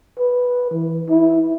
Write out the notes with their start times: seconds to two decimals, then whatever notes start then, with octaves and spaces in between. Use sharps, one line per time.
0.18 B4
0.71 E3
1.10 E4